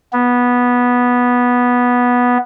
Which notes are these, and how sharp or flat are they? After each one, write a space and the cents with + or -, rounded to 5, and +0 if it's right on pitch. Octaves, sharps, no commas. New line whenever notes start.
B3 -10